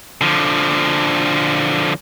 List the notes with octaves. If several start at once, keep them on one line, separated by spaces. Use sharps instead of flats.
D3 F3